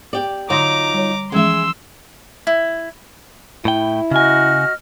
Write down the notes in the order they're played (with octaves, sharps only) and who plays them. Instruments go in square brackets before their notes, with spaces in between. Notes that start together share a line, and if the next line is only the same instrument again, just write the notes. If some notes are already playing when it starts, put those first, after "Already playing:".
[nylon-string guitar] G4 D5
[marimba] D3 C6 A#6 [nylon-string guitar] F#3 D#4 F4 [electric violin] A#5 D6
[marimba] G3 C#5
[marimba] E3 F3 C#4 [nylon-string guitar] G#3 E5 [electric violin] C6 E6
[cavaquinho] E4
[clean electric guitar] A2 G5 [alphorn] E4
[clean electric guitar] C#3 G#5 [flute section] F#4 D#5 F6